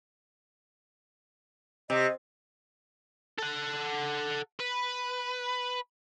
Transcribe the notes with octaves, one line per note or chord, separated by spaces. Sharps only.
C3 D#5
A4 F#5
B4